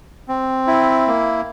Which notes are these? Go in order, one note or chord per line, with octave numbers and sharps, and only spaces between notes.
C4
E4
A#3